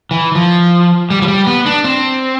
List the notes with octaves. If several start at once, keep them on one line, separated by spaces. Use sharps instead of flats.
E3
F3
G3
F3
G3
B3
D4
C4